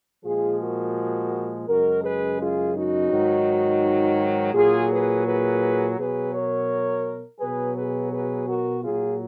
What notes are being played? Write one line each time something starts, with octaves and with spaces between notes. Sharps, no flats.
A#2 F3 G#3 F4 G#4
F#4 A#4
F#2 C#3 G#3 F#4 A#4
G#4 B4
F4 G#4
D#4 F#4
G#2 D#3 F#3
A#2 F#3 F4 G#4
G#4 B4
G#4 B4
B2 F#3 G#4 B4
A#4 C#5
B2 F#3 G#4 B4
G#4 B4
G#4 B4
F#4 A#4
A#2 F#3 F4 G#4